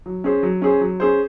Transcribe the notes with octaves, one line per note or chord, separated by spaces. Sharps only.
F#3
C#4 G#4 C5
F#3
C#4 G#4 C5
F#3
C#4 G#4 C5